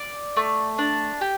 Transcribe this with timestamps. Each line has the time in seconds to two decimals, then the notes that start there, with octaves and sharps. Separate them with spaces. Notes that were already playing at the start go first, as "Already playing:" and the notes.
Already playing: D5
0.37 A3
0.78 D4
1.21 G4